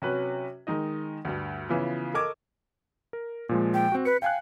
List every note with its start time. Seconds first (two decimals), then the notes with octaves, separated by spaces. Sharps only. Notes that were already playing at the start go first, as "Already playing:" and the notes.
0.02 C3 F#3 C#4 F#4 B4
0.67 D#3 G#3 D#4 D#5
1.25 D2 G2
1.69 C#3 E3 F3 B3
2.14 A4 A#4 D#5 C#6 D6 G#6
3.13 A#4
3.49 A#2 F3 G#3
3.74 G5
3.92 C4 F#4
4.05 B4 C#7
4.22 F5 G5 G#5 F#6